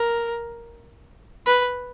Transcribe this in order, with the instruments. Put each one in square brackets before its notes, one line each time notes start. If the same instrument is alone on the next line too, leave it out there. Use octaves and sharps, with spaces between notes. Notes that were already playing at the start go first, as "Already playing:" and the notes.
Already playing: [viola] A#4
B4